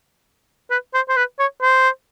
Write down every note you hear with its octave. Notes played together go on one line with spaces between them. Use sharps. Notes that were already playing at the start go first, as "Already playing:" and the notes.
B4
C5
C5
B4
C#5
C5